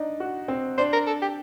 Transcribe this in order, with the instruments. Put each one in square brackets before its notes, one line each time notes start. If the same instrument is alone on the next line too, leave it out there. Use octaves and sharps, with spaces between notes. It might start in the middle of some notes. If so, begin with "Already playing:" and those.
Already playing: [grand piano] D4 D#4
F#4
C4
[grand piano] D4 [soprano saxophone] C5
[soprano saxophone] A#4
A4
G4